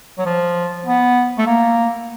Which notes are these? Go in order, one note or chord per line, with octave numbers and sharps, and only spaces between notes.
F#3
F3
B3
A3
A#3